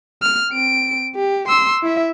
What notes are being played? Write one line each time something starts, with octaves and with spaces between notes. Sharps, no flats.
F6
C4 D7
G4
C6 E6
E4 E5